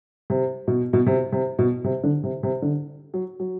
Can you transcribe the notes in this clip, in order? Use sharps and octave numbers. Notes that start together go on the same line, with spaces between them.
C3
B2
B2
C3
C3
B2
C3
D3
C3
C3
D3
F#3
F#3